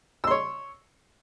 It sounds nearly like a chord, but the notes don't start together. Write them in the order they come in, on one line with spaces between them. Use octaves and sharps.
E6 C6 C#5